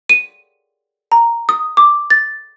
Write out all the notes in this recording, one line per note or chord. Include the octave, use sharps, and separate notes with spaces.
D#7
A#5
D#6
D6
A6